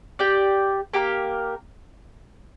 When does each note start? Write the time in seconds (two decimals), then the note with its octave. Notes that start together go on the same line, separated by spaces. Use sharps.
0.19 G4 D5 G5
0.94 A#3 G4 A#4